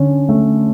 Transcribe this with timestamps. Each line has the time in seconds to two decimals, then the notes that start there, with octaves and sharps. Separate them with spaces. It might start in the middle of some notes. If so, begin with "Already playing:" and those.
Already playing: D3 C#4
0.29 A3